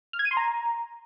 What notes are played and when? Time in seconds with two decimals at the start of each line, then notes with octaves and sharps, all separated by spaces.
0.13 F6
0.19 G#6
0.25 D#7
0.31 C6
0.37 A#5